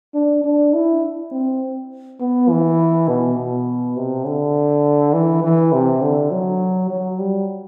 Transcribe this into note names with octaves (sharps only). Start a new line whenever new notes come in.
D4
D4
E4
C4
B3
E3
B2
B2
C3
D3
E3
E3
C3
D3
F#3
F#3
G3